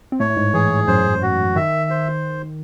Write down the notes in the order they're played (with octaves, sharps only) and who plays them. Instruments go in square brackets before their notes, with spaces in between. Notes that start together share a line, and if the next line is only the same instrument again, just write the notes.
[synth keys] C4
[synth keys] A2 A3 [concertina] C#5
[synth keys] A3
G#2 G#3
[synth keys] E3 [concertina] G#4
[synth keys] E3
[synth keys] F#2 F#3 [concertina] C5
[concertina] F#4
[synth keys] D#3 [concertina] E5
[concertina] C5